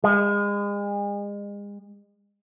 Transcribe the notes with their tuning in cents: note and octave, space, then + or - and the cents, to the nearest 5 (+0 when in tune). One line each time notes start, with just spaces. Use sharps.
G#3 -35